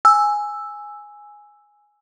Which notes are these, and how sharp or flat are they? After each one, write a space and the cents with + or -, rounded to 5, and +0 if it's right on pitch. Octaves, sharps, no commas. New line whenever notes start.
G#5 +0 E6 +0